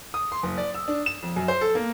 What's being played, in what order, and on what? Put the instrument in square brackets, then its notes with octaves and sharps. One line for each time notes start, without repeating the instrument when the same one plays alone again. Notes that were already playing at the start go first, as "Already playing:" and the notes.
[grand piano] D#6
C6
F#1
D5
E6
D4
E7
F2
F#2
C5
A4
A#3